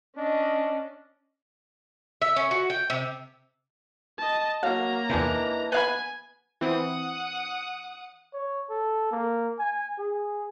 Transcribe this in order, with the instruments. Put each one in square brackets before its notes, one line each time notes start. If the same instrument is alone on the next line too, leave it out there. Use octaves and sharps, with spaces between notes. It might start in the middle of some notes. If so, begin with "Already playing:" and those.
[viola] C#4 [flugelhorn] D4 [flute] D#5
[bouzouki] E5
C#4
F#4
G5
C3
[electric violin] D#5 A5
[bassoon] F#3 [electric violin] A#3 A#5 [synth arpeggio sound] F5
[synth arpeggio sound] E2 C3 [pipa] D#3 G#3 D4 [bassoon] E3
[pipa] B3 F5 B5 [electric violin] G#5 [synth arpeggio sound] F#6
[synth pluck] E3 C4 [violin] F#5 D#6
[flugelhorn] C#5
A4
A#3
G#5
G#4